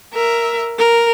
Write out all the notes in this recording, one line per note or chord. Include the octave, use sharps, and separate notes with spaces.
A#4 E5
A#4